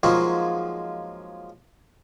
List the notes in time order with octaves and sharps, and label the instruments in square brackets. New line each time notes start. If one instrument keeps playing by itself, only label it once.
[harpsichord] F3 F#3 G#3 A#3 D#4 F#4